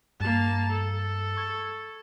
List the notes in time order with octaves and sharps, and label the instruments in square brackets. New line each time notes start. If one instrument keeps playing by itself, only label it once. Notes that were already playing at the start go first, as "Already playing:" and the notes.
[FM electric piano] G2 [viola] A#3 A5
[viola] A4
[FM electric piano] C#6 G#6